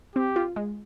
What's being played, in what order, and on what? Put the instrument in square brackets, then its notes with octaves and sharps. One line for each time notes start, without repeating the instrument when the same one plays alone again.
[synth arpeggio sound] C4 [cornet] G4
[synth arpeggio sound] F4
G#3